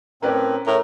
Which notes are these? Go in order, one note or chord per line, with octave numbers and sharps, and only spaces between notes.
A2 C4 C#4 A#4 B4 D5
A2 A#4 A#5